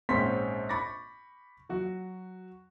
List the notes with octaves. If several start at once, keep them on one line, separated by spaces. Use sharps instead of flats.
A#1 G#2 C4 C#4 C6 B6
B5 C#6 D6 A6 A#6
F#3 F#4